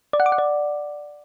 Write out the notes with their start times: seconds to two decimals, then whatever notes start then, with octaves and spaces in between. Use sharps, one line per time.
0.13 D5
0.20 F#5
0.26 D6
0.32 F#5
0.38 D5